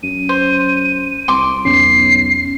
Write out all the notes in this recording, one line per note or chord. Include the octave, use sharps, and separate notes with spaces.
F#2 D#7
C5
C2 C6 D6
B1 E2 C#4 C7